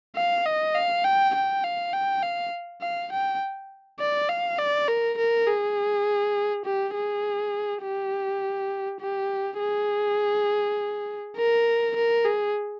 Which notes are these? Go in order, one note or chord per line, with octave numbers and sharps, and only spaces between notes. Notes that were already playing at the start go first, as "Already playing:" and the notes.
F5
D#5
F5
G5
G5
F5
G5
F5
F5
G5
D5
F5
D5
A#4
A#4
G#4
G4
G#4
G4
G4
G#4
A#4
A#4
G#4